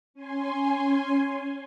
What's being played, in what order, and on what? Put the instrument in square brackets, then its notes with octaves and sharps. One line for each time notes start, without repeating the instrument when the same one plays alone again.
[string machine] C#4 G#5 C6